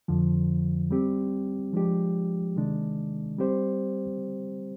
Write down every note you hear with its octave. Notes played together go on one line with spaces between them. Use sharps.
F2 D3 F3
G3 C4 G4
F3 G#3 D4 G4
C3 D#3 G#3 D4
G3 C4 G4 C5